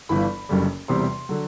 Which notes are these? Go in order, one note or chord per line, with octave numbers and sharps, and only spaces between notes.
G1 G2 E3 B5
F#1 F#2 D3 G3
E1 E2 C3 G3 C4 C6
D3 F#3